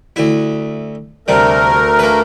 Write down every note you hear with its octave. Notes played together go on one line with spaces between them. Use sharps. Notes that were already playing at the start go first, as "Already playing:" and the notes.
D2 E4
D2 C3 G3 A3 A#4
A#3 B4